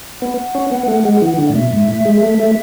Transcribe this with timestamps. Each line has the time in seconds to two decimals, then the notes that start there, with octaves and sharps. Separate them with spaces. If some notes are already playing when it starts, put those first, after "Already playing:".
0.21 B3 F#5
0.55 C#4
0.71 B3
0.88 A3
1.05 G#3
1.22 E3
1.38 D3
1.48 A2 D5
1.55 B2 E5
1.73 G#2
1.88 A2
2.05 G#3
2.23 A3
2.39 A3